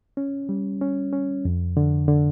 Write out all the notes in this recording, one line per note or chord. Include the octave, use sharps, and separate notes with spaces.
C#4
G3
C#4
C#4
F2
D3
D3